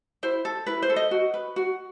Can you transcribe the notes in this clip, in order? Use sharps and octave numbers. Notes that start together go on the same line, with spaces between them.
E4 C5
A4
E4 B4
C5
A4
D#5
F#4
B4
F#4